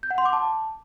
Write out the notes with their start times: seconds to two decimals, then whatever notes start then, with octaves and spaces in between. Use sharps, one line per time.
0.03 G6
0.11 F#5
0.18 C6
0.25 D6
0.33 A5